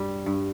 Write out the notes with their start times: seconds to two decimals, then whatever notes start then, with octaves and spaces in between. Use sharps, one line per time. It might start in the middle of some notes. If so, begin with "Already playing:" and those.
Already playing: G2 G3
0.26 G2